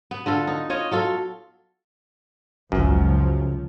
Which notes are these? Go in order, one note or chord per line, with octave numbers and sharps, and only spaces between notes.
B3
D3 F4 A4
D#4
F4 C#5 D#5
F#3 F4 A4
G#1 C#2 F#2 F3 F#3
C#3